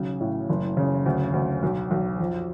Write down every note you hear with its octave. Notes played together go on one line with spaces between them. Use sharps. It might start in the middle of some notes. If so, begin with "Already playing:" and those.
Already playing: B1 C#3
A2
F#1
C#3
D2
D2
B1
B1
F2